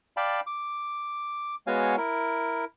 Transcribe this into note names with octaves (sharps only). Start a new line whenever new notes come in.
D5 F5 G5 A5 B5
D6
G#3 B3 F#4 C#5 F5 G#5
E4 A#4